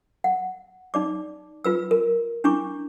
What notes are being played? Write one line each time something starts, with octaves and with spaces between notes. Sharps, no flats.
F#5
D#4 D5 D6
F4 B4 E6
A#4
D4 E4 C#6 D6